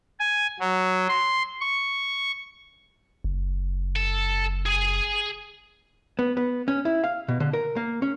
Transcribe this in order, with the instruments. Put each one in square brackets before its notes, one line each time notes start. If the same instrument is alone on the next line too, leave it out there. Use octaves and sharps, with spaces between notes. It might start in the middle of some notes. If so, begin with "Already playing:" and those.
[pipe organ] G#5
F#3
C6
C#6
[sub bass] F#1
[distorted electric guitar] A4
G#4 G#5
[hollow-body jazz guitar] B3
B3
C#4
E4
F5
B2
D3
A#4
A#3
C#4